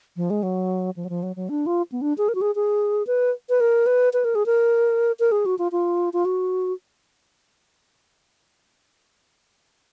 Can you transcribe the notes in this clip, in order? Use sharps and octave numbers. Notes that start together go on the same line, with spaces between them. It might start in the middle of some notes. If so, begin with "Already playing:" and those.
F3
G#3
F#3
F3
F#3
F3
F#3
F#3
D4
F4
B3
D4
G#4
A#4
F#4
G#4
G#4
B4
B4
A#4
B4
B4
A#4
G#4
A#4
A#4
G#4
F#4
F4
F4
F4
F#4